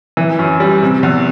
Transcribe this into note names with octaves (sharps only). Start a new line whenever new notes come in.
E3
F#2
G3
C3
E2